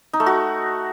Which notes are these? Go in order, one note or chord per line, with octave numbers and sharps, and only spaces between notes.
D#4
A3
F#4